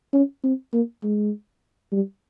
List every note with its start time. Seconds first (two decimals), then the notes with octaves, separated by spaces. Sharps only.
0.13 C#4
0.44 C4
0.73 A#3
1.03 G#3
1.92 G3